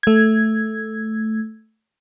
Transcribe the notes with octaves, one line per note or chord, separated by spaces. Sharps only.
A3 G#6